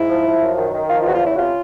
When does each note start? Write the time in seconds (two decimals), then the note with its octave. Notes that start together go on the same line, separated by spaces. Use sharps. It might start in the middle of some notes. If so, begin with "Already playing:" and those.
Already playing: G#2 E4
0.09 F3
0.26 F3
0.41 F#2
0.58 D#3
0.73 D#3
0.90 F3 F4
1.03 F4
1.06 E2 F#4
1.14 F4
1.23 C#3 E4
1.34 F#4
1.39 C3 F4